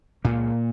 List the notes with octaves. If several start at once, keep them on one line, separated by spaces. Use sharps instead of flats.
C#2 A#2 C#3 A#3